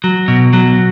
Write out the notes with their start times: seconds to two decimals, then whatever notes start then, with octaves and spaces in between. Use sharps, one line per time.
0.04 F#3
0.28 B2
0.53 F#3